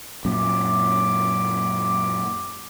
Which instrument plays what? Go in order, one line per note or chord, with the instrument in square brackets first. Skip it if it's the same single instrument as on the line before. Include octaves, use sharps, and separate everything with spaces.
[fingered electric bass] F#2 A#2 [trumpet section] D6